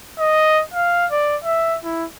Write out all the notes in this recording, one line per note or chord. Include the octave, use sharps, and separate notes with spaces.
D#5
F5
D5
E5
E4